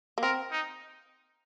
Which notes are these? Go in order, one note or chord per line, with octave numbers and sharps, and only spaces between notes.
A#3
C4 A#4
D#4